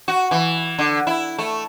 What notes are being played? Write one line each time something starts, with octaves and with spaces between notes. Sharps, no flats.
F#4
E3
D3
E4
A3